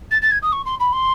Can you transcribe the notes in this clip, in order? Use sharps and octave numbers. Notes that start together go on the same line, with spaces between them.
A6
A6
G#6
D#6
C#6
C6
B5
C6